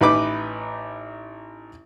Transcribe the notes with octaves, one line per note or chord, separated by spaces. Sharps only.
A1 D#4 B4 B5 D6